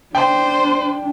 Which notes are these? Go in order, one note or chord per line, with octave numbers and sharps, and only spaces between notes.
D4 C5 G5